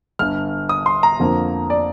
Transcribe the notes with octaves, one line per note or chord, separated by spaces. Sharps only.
G1 G2 D3 F6
D#6
C6
A#5
F2 D3 F3 A#3
D5